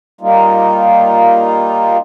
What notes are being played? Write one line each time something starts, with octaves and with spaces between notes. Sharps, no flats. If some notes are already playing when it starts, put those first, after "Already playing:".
G3 A#3 D#4 F4